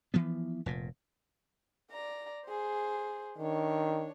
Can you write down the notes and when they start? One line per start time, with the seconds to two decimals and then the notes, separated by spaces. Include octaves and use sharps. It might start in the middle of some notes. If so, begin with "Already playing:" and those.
0.14 E3 F3 B3
0.66 F1 A#2
1.91 D5 A#5
2.46 G#4 C5
3.38 D#3 D4 C#5